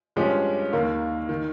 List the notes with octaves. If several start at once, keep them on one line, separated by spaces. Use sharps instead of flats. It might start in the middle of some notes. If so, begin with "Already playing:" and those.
G2 F3 G#3 C#4 G4
D#2 D#3 A#3
D#3